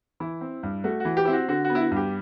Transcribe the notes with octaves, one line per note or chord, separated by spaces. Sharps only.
E3 E4
C4
G2
A3 F#4
E3 F#4
G4
C4 E4
F#4
D3 F#4
F#4
B3
E4
F#4
G2
G4